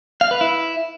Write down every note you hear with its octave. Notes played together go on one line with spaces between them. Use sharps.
F5
B4
E4